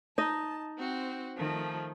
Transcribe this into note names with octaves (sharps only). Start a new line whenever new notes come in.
D#4 D#5 A5
C4 F#4 C5
D#3 F3 A3